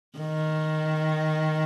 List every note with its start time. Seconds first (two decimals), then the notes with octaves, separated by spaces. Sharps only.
0.19 D#3